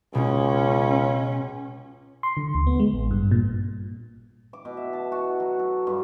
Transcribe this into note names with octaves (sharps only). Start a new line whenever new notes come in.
C#2 B2 C#4
C6
D3
D2
B3
G#3
A1
G2
A#2
D6
B2
E5
A5
F#4
F#3
A4
G2